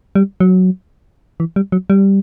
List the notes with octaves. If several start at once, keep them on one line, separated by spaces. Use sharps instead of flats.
G3
F#3
E3
G3
F#3
G3